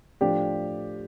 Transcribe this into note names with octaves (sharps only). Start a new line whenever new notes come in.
A2 F3 D4 G4